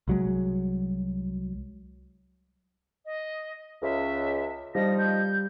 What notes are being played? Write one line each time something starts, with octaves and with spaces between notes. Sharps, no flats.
C2 F#3 G#3
D#5
C#2 E5
F3 G3 D#4 A#6
G6